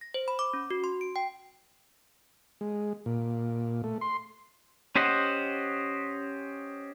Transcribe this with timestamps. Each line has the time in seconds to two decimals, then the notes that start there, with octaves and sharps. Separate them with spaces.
0.01 A#6
0.14 C5
0.28 B5
0.39 D6
0.54 C#4
0.70 F#4
0.84 C6
1.01 D7
1.16 G5
2.61 G#3
3.06 A#2
3.84 A3
4.01 C6
4.95 C#4 G4 C5 D#5 F#5